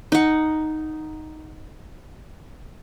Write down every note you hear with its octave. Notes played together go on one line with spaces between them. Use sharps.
D#4 F#5